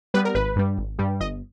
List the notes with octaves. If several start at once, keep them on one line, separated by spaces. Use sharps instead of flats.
G3 B3 B4
A#4
G#1 B4
G2 G3
G#1
G2 G3
G1 D#5